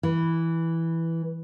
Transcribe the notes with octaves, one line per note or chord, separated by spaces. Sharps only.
E3